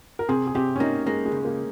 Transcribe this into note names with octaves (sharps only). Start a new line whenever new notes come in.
A#4
C3 G#4
G#4
C3 G4
C#4
A#3 D#4
G#3 A#3
G#3
C#2
A#3